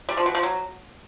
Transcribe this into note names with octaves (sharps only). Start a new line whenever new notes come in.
G3
F3
B2
F3
F#3